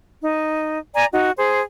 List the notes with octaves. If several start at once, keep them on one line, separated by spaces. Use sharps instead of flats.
D#4
D5 G#5 A#5
D#4 F#4
G#4 C5